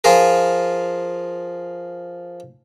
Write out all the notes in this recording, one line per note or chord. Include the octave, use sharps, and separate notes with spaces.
F3 F4 G#4 A#4